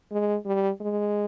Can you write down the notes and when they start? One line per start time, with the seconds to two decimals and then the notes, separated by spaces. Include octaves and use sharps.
0.11 G#3
0.46 G3
0.81 G#3